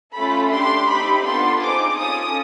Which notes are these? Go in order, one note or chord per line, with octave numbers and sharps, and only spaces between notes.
A3 C#4 F4 A4 B5
D4 G4 C6
A3 C4 D#4 G4 B5
B3 D4 F4 A4 C6
C4 D#4 G#4 D6
C#4 F4 A4 D#6